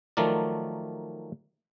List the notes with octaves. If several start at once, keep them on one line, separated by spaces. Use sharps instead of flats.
D#3 F3 F#3 A3 A#4 D5